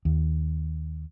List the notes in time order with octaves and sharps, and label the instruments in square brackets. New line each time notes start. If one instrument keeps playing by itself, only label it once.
[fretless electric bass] D#2